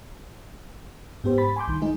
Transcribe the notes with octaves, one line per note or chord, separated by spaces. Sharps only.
G#2 B3 G4 C5
B5 A6 B6
G#5 C6 D6 G6
C2 D#3
G#3 D#4 G#4